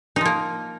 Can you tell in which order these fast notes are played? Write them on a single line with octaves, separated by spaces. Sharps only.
D#4 F3 A#3